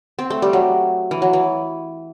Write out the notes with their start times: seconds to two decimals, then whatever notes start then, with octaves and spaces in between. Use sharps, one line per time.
0.19 C4
0.30 A3
0.42 G3
0.53 F#3
1.11 E3
1.22 F#3
1.33 E3